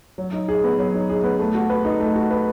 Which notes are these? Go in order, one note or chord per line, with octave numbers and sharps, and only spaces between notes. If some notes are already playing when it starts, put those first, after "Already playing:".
F#3
D#4
G#4
B3
F#3
D#4
G#4
B3
A3
F#4
B4
D#4
A3
F#4
B4